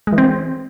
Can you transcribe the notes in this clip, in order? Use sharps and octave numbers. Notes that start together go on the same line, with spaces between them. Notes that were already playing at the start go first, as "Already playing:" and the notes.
G#3
E3
C4